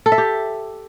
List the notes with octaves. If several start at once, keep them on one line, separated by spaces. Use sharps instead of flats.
A4
E5
G4